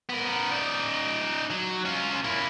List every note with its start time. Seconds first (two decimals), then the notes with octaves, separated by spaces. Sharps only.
0.10 B3 A#4
0.52 D#4 D5
1.50 F#3
1.85 C#4 F4
2.24 A#3 E4